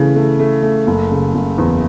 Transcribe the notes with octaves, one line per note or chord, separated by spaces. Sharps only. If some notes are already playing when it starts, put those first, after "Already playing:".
Already playing: C#3 E3 A3
A3
A3
A3
F#1
C#3
F#1
E2